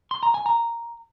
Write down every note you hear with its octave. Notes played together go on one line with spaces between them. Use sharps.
C6
A#5
G#5
A#5